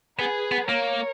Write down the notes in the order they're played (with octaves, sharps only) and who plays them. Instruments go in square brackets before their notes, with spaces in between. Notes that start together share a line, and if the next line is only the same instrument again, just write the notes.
[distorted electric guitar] B3 [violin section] G#4 B4
[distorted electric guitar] B3
[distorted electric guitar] A#3 [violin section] A#4 C#5